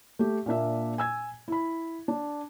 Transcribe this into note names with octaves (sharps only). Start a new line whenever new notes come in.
A3 G4
A#2 A#3 D4 E5
G#5 E6 G#6
E4 B5
D4